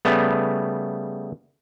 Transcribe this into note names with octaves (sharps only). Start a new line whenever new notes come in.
C#3 G3 A3 B3